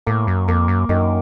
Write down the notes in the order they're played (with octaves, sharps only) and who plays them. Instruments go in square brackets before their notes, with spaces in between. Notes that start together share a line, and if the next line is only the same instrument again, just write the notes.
[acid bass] A2 [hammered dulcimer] A#3
[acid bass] F#2
[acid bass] F2 [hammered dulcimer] A#3
[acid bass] F#2
[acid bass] F#2 [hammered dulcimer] D#3